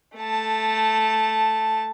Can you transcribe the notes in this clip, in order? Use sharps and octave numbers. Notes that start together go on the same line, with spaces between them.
A3 A5